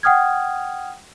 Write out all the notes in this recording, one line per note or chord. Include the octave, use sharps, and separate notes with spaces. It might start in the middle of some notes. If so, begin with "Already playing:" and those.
F#5 G5 D#6 F6 G#6